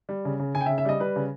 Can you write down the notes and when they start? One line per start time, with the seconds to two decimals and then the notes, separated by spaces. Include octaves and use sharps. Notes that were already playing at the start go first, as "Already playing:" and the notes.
0.09 G3
0.25 C#3
0.39 C#3
0.55 C#3 G#5
0.61 G5
0.66 E5
0.70 C#3
0.78 E5
0.85 G3 D#5
1.00 G3 B4
1.16 C#3